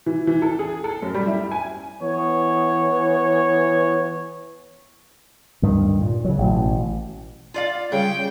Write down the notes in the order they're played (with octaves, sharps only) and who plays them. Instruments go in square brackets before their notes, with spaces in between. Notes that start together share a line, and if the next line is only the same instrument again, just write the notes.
[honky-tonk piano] E3
E3
A4
G#4
A4
F#2
G3
E4
G#5
[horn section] E3 B3 C#5
[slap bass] D2 G2 D#3
A#2
C#3 F#3
A1 B2
[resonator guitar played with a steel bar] F4 D5 F5
[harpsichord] C#3 [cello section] G3 [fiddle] G5